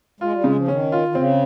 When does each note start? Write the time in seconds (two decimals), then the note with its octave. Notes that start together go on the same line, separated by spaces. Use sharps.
0.20 G#3 F4
0.33 G3
0.44 C#3 G#3
0.56 F3
0.68 D#3 C#4
0.92 F4
1.08 D#3
1.15 C#3 C4